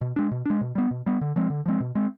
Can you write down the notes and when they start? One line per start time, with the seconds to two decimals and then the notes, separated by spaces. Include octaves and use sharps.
0.01 B2
0.16 G#3 D4
0.31 B2
0.46 G#3 D4
0.61 B2
0.75 G3 B3
0.91 B2
1.06 G3 B3
1.21 D3
1.36 F3 G#3 C4
1.50 D3
1.66 F3 G#3 C4
1.80 B2
1.95 G#3 C4